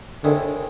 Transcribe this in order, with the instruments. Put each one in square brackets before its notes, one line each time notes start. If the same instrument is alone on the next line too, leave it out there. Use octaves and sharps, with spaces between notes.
[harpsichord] D#2 D#3 G#3 C4 E4 [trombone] D3